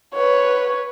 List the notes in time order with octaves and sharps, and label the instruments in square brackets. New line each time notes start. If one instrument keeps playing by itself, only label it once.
[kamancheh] B4 C#5